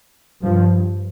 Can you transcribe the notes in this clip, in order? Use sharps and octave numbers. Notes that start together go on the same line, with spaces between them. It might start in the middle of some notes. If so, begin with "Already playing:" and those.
G2 F3